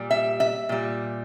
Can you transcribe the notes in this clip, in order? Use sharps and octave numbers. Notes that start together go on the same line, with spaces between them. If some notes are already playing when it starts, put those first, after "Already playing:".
Already playing: A#2 G3
E5
E5
A#2 G3